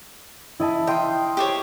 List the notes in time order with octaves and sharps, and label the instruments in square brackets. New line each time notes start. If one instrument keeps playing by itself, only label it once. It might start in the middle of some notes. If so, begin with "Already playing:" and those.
[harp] E4 D#5 A5
[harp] D#5 F5 C6 [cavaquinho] G5
[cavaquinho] G4 C5 C#5